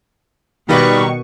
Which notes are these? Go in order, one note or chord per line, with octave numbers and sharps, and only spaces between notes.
B2 D#3 G3 D#4 B4 D5 C#6